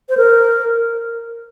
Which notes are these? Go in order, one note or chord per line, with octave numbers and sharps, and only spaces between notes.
C5
A#4